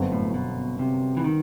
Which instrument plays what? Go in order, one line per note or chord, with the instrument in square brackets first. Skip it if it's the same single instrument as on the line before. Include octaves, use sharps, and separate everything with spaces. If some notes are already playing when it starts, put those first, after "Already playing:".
Already playing: [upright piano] G1 F#2 F#3 C4 F#4
[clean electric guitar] A2
B2
C3
E3
D#3